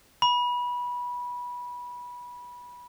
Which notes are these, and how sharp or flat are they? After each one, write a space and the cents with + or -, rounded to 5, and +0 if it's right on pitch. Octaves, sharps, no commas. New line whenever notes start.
B5 -20